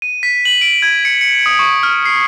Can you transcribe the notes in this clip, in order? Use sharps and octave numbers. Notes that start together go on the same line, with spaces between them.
D#7
B6
F#7
D7
G#6
C#7
C#7
D#6
C#6
F6
C7